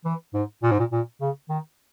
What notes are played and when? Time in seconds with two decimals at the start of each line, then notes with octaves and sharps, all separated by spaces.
0.05 E3
0.34 G#2
0.63 A#2
0.71 G#2
0.79 A#2
0.92 A#2
1.21 C#3
1.49 D#3